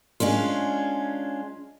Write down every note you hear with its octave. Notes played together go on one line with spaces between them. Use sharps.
G#3 C#4 D4 F4